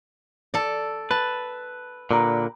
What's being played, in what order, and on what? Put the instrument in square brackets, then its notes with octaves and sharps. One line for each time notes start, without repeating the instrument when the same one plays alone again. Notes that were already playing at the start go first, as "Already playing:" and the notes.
[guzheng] A4 D5
[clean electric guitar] B4 [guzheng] A5
[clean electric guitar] A#2 D3 [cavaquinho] G4 A#4 B4